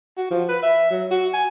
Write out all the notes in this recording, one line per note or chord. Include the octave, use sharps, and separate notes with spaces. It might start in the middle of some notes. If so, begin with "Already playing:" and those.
F#4
F3
B4
E5
F#3
F#4
G#5